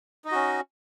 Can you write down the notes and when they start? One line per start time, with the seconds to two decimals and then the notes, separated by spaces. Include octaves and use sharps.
0.25 D#4
0.28 D#5
0.31 F#4
0.35 C#4